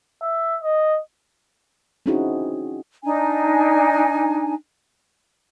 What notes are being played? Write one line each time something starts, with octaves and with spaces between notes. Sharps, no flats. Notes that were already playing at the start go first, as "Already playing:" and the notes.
E5
D#5
C4 C#4 D#4 E4 F#4 G#4
D4 D#4 G#5